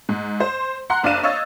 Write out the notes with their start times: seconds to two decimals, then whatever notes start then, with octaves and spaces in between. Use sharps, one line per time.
0.09 G#2
0.40 C5
0.90 F#5 A#5 C6 F#6
1.03 F#1 D4 D5 F5 D#7 E7
1.23 C#5 D#5 F5 E6 A6